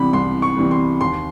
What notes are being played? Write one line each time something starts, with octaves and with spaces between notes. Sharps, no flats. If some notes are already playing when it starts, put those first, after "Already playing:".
Already playing: C3 E3 G3 B3 B5
C2 C6
C#6
C3 E3 G3 B3
C6
D#2 C6